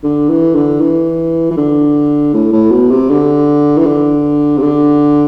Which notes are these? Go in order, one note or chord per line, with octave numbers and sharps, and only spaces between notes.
D3
E3
D3
E3
E3
D3
A2
A2
B2
C3
D3
E3
D3
C3
D3